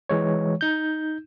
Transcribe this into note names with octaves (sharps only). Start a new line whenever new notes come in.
E3 G#3 C#5
D#4 G6